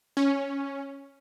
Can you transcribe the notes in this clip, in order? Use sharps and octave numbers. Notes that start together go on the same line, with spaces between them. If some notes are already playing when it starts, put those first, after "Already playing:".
C#4